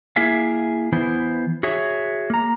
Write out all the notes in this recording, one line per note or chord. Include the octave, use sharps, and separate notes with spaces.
A#3 E4 G#4 E5 F5
E3 B3 E4 C5
F#4 G#4 C#5 E5
A#3 A#5